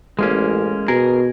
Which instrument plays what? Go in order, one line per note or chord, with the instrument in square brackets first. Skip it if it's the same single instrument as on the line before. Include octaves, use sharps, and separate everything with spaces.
[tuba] A1 [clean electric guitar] G#3 A#3 C#4
[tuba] B2 [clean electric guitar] G#4 A#4